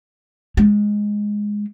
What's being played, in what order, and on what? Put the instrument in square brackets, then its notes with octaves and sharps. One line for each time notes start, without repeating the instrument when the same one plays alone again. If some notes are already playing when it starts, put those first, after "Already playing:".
[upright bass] G#3